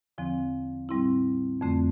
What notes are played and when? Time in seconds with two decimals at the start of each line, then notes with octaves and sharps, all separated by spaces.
0.18 E2 D3 F3 C4
0.89 A2 G3 C4 E4
1.61 F2 D3 A3 C4